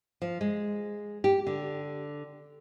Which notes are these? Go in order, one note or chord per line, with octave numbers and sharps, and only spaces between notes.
F3
G#3
G4
D3